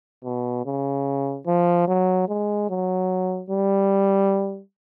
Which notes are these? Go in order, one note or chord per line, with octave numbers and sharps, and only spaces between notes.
B2
C#3
F3
F#3
G#3
F#3
G3